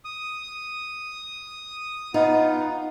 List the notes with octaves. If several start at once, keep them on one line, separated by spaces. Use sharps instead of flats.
D#6
B3 D#4 F4